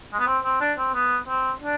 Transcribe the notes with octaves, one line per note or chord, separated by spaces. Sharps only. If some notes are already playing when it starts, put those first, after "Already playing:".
G#3
B3
C4
C4
D4
C4
B3
C4
D4